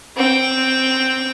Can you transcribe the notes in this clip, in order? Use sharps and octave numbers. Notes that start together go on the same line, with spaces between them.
C4 G5